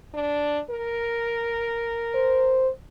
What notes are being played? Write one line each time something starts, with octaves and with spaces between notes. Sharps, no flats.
D4
A#4
C5